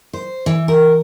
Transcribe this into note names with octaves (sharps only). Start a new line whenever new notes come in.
C5
E3
A#4